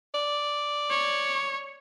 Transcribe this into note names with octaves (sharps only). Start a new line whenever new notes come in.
D5
C#5